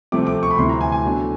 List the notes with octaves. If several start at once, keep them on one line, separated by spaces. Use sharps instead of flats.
C3 F3 A3 C4 D6
D6
C#6
B5
D2 C3 E3 C6
A#5
G#5
G#5
B2 F#3 A3 D4